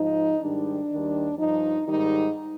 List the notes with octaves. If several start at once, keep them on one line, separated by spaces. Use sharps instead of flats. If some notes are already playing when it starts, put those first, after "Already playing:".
Already playing: G#2 F3 D#4
G#2 D#3 G3 D4
D#2 D#3 G3
G2 F3 D#4
G#2 D#3 G3 D#4